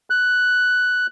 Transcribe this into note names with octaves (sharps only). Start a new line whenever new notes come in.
F#6